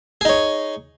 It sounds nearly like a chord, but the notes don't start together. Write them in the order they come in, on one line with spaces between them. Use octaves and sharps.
G#4 D#4 C#5